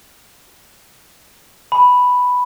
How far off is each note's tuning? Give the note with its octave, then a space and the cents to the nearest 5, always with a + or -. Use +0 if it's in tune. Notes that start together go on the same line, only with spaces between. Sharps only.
G#5 +45 B5 +0